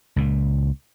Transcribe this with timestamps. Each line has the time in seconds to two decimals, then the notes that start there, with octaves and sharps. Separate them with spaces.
0.16 C#2 A#2